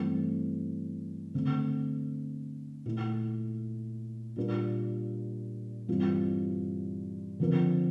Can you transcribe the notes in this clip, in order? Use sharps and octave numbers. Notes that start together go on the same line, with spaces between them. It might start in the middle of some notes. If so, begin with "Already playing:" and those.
Already playing: G2 E3 A3 C4
D3 A3 C4
A#2 A3 E4
A#2 G3 D4 F4 A#4
G2 E3 G3 C4 F4
D3 F3 C4 F4 A#4